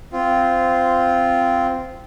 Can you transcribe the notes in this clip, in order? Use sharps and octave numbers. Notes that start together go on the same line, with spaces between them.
C4 F4